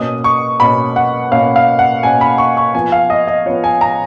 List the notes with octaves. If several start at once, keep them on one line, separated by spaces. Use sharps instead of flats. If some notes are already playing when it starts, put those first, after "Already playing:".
Already playing: B2 A#3 C#4 D#6
C#6
B2 A#3 C#4 B5
F#5
B2 A#3 C#4 F5
F5
F#5
B2 A#3 C#4 G#5
B5
C#6
C#6
F3 B3 G#5
F5
D#5
D#5
F3 B3 C#5
G#5
A#5